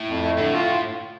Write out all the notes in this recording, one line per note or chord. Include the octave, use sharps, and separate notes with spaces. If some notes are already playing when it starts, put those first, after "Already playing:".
Already playing: A2
F2
A3
A2 D3
F4